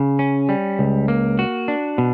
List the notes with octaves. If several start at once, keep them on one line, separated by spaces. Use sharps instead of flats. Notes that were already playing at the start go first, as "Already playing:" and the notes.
Already playing: C#3
C#4
G3
C#2
A#3
F#4
D4
B2